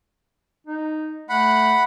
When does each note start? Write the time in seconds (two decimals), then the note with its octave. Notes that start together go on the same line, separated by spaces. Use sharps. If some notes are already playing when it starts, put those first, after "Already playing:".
0.67 D#4
1.29 A3 F#5 B5